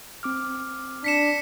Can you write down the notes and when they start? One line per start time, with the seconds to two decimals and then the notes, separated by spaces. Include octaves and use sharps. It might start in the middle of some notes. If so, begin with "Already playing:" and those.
0.23 C4 D6 F6
1.04 D4 B6 C#7 E7